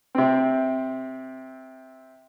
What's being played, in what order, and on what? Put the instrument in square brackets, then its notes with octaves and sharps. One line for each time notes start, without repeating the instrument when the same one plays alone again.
[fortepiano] C3 C4